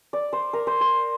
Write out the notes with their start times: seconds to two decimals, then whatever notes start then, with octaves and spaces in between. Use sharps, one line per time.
0.13 D5
0.33 C5
0.53 A#4
0.67 C5
0.81 C5